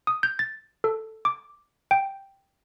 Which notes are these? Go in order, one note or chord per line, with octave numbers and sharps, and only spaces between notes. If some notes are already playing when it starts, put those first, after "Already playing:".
D#6
G6
A6
A4
D6
G5